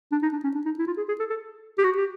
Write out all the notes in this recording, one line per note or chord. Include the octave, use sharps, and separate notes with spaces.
D4
D#4
D4
C#4
D4
D#4
E4
F4
G#4
G#4
A4
A4
G4
F#4
G4